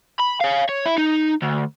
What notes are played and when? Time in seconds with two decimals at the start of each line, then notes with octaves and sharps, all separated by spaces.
0.20 B5
0.41 C#5 F5
0.69 C#5
0.86 E4
0.98 D#4
1.42 D2